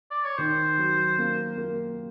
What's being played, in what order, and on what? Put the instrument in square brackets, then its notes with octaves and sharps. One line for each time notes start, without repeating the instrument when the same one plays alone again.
[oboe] D5
C#5
[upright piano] D#3 [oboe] C5
[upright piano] F#3
A#3
A#3